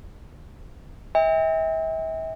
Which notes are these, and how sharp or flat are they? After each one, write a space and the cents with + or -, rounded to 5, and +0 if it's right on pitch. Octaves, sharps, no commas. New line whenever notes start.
E5 -40 G5 +35